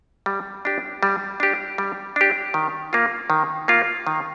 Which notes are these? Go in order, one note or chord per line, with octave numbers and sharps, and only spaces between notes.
G3
D4 G4
G3
D4 G4
G3
D4 G4
D#3
A#3 F4
D#3
A#3 F4
D#3